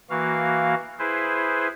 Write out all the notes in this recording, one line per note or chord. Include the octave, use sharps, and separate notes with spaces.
E3 A#3 F#4 F5
E4 G#4 B4 C5